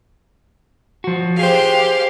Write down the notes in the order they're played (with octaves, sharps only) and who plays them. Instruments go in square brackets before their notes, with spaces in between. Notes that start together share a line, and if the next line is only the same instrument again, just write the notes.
[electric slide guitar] F3 F#4
[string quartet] G4 F5 [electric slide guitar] G#4 C5